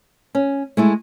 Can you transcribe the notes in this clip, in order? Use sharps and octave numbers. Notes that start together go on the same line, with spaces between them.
C#4
G#3 A3 E4